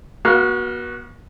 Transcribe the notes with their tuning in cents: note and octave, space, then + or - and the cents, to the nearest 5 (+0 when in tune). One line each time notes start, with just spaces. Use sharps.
B3 -45 F#4 +0 F5 +0